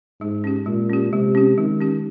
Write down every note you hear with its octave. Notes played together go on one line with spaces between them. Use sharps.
G#2 G#3
C#4 G4
A#2 G#3
C#4 G4
C3 G#3
C#4 G4
D#3 G#3
C#4 G4